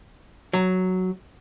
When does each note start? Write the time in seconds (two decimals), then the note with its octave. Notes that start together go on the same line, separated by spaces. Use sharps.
0.53 F#3